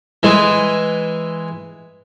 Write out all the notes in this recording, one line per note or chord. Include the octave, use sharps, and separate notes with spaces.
E3 G#3